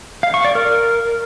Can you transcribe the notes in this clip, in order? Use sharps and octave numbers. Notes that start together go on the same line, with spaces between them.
F5
C#6
D5
A#4